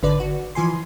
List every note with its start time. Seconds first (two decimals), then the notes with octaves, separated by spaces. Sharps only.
0.03 G#1 D3 B4 D5
0.20 F#4
0.55 E3 F3 G#5 C6